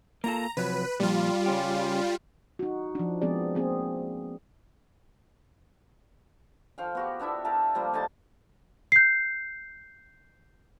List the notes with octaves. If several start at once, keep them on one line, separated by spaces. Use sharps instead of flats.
A#3 F4 A4 A#5
C3 F3 F#3 B4
A#2 F3 G3 F4
C#3 C#4 G4
D#4 F#4
F3 D4
F3 G#3 B3 C4 G#4 D5
A#3 C4 G#4
F3 F5 G5
B3 F#4 G4
B3 D4 E4 E5
A#4 E5 G5 A5
F3 G3 A#3
D3 D#4 A5
G6 C7